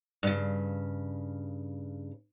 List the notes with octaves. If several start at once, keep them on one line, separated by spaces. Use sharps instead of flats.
G2 C#3